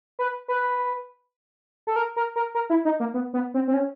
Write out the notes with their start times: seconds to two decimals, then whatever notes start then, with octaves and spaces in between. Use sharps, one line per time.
0.19 B4
0.48 B4
1.87 A4
1.96 A#4
2.16 A#4
2.36 A#4
2.55 A#4
2.70 E4
2.85 D#4
3.00 A#3
3.14 B3
3.34 B3
3.54 C4
3.68 C4
3.74 C#4